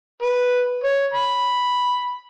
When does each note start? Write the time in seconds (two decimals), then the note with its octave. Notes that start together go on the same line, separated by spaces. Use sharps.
0.22 B4
0.84 C#5
1.14 B5